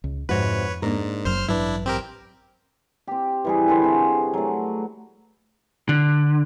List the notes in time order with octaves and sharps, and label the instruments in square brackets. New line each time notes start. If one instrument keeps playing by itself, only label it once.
[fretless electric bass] C#2
[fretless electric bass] F2 [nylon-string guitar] G#2 C3 F#4 [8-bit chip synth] B4 C#5
[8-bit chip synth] G#2 [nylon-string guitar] A#3 D4 A#4
[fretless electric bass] F#1 F#2 F#3 [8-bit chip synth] C5 C6 F6
[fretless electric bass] A1 G2 F#3 [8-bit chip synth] D4 E4 [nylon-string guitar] B4
[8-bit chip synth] C4 G4 A#4
[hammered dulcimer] C4 G4
E3 G3 G#4
D3 B4 C5 G#5
C3 F#4
F#3 A3
[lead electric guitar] D3